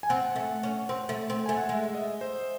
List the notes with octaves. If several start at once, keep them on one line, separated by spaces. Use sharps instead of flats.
G#5
C4 F#5
A3
C#4
C4
A3
C4
A3 G#5
F#5
G#3 E5
E5
D#5
C5